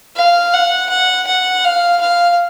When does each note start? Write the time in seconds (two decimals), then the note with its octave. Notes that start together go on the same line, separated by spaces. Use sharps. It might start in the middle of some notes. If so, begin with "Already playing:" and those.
0.16 F5
0.53 F#5
0.89 F#5
1.27 F#5
1.65 F5
2.01 F5